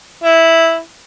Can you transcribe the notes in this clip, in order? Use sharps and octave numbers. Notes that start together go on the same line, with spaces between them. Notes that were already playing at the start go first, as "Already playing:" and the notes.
E4